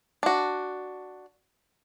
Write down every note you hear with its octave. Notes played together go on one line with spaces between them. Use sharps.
D4 F#4